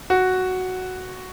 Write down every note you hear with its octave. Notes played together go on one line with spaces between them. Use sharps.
F#4